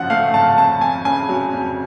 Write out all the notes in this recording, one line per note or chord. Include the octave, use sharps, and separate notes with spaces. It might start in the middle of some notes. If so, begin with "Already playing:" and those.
Already playing: G#1 F#2 F3 F#5
A3 F5
G#1 A5
F2 A5
F2 G#5
C#3 G#5
F#3
F2